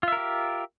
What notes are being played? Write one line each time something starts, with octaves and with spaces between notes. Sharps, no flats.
F4 G4 A#4 E5